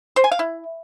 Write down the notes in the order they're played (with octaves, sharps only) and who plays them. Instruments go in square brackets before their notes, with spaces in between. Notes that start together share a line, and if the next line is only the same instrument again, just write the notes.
[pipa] C5
G#5
F5
E4